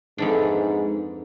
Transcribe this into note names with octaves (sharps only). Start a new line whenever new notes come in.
F2 G#2 E3 D4